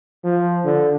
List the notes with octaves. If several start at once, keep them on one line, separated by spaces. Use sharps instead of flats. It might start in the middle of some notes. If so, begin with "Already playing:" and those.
F3
D3